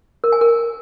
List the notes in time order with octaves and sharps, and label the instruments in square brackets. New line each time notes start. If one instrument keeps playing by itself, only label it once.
[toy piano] A#4
G#5
A#4